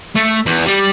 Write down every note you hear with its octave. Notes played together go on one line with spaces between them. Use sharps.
A3
E2
G3